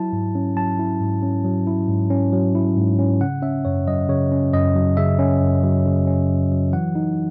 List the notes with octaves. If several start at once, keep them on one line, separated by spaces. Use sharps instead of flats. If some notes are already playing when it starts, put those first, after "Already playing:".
Already playing: F#3 E4 A5
G#2
C#4
F#3 A5
E4
G#2
C#4
F#3
E4
G#2
C#4
F#3
E4
G#2
C#4
C#3 F#5
C#4 E5
F#2 C#5
F#3 D#5
C#3 C#5
C#4
F#2 D#5
F#3
C#3 E5
C#4
F#2
F#3
C#3
C#4
F#2
F#3
E3 F#5
D#4